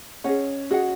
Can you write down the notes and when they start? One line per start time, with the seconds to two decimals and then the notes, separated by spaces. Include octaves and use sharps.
0.24 C#4 G#4 D#5 F#5
0.71 F#4 G#4 D#5 F#5